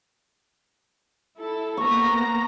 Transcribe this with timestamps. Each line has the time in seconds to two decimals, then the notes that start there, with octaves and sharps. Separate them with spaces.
1.37 E4 A4
1.77 A#3 B3 A#5 C#6